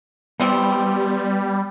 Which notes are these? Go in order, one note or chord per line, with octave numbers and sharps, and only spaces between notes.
E3 G3 G#3 B3 C4